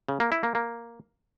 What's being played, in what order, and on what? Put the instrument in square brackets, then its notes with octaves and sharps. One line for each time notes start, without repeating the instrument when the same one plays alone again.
[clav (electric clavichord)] C#3
A#3
E4
A#3
A#3